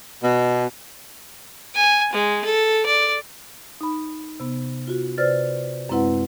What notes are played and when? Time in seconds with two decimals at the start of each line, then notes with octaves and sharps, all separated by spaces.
0.23 B2
1.75 G#5
2.13 G#3
2.45 A4
2.86 D5
3.81 D#4 B5
4.40 C3 B3
4.87 F4 F#4
5.18 C3 B4 C5 D5 F6 A6
5.89 F#2 G#3 C4 E4 B4 F#5